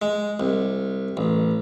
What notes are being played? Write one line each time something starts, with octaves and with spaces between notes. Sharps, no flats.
G#3
C2
A1